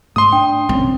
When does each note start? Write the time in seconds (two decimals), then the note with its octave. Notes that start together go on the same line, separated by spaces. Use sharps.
0.16 G#2 A3 C6 D#6
0.32 D4 G5
0.69 D#1 C2 C4 C#4